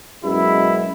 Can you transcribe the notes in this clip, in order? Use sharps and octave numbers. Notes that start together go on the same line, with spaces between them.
F#2 B2 G#3 E4